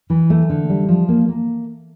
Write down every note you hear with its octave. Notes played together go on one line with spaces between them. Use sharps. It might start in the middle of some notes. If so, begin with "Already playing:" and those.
E3
A3
D3
G3
F3
A#3
A#3